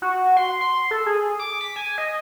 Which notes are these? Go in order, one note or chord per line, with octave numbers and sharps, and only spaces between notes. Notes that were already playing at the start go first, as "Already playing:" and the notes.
F#4
C6
C6
A4
G#4
D6
B6
G#5
D#5